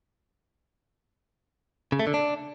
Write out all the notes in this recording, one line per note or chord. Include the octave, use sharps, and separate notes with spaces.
C#3
A3
D3
D4